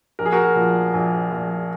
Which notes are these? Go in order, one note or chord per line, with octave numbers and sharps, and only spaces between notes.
A#1 A#4
G#4
F#4 A#4
A#2 F3
A#1
A#2 F3